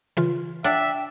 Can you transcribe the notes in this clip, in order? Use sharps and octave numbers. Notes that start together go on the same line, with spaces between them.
C#3 E3 F4
D4 E5 F#5 G5